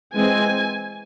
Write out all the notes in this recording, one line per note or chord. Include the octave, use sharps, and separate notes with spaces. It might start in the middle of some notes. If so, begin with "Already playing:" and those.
E3 G#3 C4 G#5